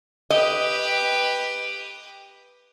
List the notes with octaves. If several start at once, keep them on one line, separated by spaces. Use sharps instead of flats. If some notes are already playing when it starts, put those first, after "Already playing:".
G4 B4 D#5